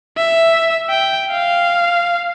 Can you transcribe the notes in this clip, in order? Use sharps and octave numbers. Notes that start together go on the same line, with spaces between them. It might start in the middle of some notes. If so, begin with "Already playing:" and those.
E5
G5
F5